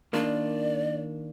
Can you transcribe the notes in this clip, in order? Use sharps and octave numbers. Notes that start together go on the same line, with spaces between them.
D#3 A#3 D4 F4 D5